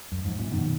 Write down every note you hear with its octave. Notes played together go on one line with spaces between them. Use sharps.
F#2
F2 G#2
F#2 A#2
B2 D#3